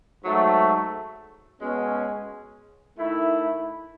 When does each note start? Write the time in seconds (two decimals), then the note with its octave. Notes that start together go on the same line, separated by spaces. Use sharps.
0.24 G#2 F#3 A3
1.61 B2 G#3 C#4
2.98 D#3 A3 E4